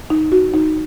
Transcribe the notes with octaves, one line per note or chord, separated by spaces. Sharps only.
D#4
F#4
D#4